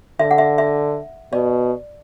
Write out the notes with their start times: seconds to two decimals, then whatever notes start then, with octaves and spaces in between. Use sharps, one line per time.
0.19 D3 E5
0.31 F#5
0.38 E5
0.58 E5
1.33 B2 D5